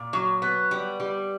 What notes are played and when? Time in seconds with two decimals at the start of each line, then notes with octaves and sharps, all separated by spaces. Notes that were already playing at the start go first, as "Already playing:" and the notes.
Already playing: A#2
0.13 F#3
0.42 B3
0.71 G3
1.00 G3